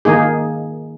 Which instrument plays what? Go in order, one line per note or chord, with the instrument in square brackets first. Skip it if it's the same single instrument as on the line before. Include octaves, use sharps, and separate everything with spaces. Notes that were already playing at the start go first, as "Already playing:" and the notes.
[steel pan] D#3 A#3 D#4 G#4